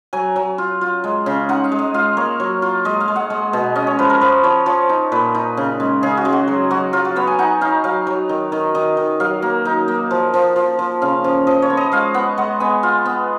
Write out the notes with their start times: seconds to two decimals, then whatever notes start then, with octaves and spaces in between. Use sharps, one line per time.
0.13 F#3 G#5
0.36 F#3
0.58 F4
0.81 F4
1.04 G#3
1.26 C#3
1.49 D#4 F#5
1.64 F5
1.72 G#3
1.79 D#5
1.94 F4 F5
2.17 A#3 C#5
2.40 F#3
2.62 F4
2.85 G#3 D#5
3.00 F5
3.08 G#3
3.16 F#5
3.30 G#3
3.53 B2
3.76 C#4 D#5
3.87 C#5
3.99 F3 B4
4.10 A#4
4.21 F3 B4
4.44 F3 C#5
4.66 F3 C#5
4.89 D#4
5.12 A#2 B4
5.35 D#4
5.57 C#3
5.80 G#3
6.03 C#3 G#4
6.17 F#4
6.25 G#3
6.33 F#4
6.48 F#3
6.71 F#3 F#4
6.93 F#3 F4
7.05 F#4
7.16 B3 C#5
7.27 G#5
7.39 D#4 F#5
7.61 D#4 F5
7.84 F#3 F5
8.07 F#3
8.29 D#3
8.52 D#3
8.75 D#3 D#5
8.97 D#3
9.20 F#3 F5
9.42 A#3
9.65 D#4
9.88 A#3
10.11 F3
10.34 F3
10.56 F3
10.79 F3
11.02 C#3 F5
11.24 F3
11.47 F3 D#5
11.62 C#5
11.70 B3
11.77 D#5
11.92 G#3 F5
12.14 B3 F#5
12.38 G#3 F#5
12.60 B3 G#5
12.83 F4
13.06 B3